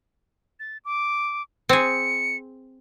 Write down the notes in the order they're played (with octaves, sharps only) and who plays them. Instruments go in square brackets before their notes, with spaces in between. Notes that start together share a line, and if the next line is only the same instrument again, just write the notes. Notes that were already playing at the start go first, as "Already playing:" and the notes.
[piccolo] A6
D6
[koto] C4 G#4 [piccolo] C#7